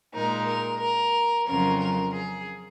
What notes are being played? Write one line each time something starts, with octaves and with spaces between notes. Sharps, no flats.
A#2 G#3 D#4 A#4
A#4
A#4
F2 C#3 F#3 C#4 F4 A#4
A#4
G#4